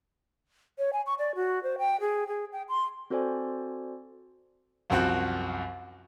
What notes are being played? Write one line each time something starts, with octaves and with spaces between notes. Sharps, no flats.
C#5
G#5
C#6
D5
F#4
C5
G5
G#4
G#4
G5
C6
C4 F#4 A4 C5 D5 G#5
C2 F#2 F3 C4 F#4 F#5